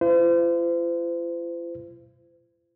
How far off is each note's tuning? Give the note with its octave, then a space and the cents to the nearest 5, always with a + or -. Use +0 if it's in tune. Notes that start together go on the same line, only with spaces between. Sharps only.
F4 -45 C5 -40